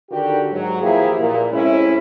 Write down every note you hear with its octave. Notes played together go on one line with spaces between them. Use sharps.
D3 D#3 F#4 G4
G#2 F#3
E3 F3 A#3 E4 G4 G#4
A#2
A2 C3 G#3 C#4 E4